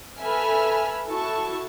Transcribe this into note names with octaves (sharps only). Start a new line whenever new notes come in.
A4 B4 E5 G#5 B5 F6
E4 F#4 A4 A5 C#6